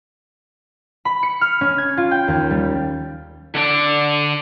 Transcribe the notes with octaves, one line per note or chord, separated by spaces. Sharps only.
B5
C#7
F6
C#4
G#6
F4
G5
D#2
G3
D3 D4 D5